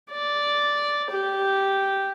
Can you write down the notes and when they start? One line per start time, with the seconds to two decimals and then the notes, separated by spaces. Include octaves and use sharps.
0.11 D5
1.10 G4